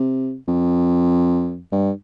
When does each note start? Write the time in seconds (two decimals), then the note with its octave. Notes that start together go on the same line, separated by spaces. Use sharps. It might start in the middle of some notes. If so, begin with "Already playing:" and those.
Already playing: C3
0.48 F2
1.72 G2